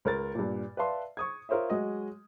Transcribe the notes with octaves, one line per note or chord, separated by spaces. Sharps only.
C#2 A#4 A6
G2 A#2
B4 D5 E5 F5 A5 C6
C#6 D#6 G#6
F4 A#4 C5 C#5 E5
F#3 G#3 F#4 D#5